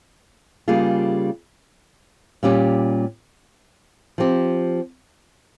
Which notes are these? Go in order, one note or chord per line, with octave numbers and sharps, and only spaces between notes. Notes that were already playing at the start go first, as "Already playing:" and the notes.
C#3 G3 A#3 F4 G#4
A#2 G3 C#4 G4
F3 C4 G4